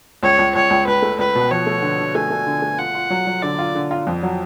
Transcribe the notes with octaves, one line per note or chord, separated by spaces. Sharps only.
C#2 C#5
C#2
C#2 C#5
C#2
C#2 B4
A3
C#2 B4
B2
F3 C#5
A3
D3
D3
A3 G#5
A3
D3
A3
F4 F#5
F4
F#3
F#3
D3 D5
F4
D3
F4
F2
F#3